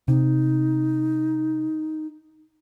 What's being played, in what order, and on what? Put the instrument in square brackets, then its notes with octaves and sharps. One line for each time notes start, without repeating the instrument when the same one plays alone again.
[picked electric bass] C3 [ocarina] D#4